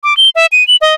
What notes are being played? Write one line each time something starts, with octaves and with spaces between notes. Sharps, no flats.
D6
G7
E5
D#7
F#7
D#5